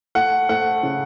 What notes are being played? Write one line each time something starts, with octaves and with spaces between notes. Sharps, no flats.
A3 F#5
A3 F#5
C#3